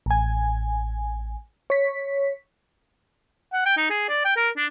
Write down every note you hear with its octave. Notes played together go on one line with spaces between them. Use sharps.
A1 G#5
C#5 B6
F#5
G5
D#4
G#4
D5
G5
A#4
D4